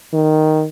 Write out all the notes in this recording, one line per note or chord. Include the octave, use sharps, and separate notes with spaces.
D#3